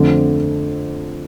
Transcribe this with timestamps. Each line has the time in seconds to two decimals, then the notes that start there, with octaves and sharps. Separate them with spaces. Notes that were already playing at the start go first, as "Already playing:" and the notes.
Already playing: F2 D3 A3 C4